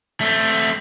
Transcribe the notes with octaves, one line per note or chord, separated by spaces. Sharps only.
A3 C4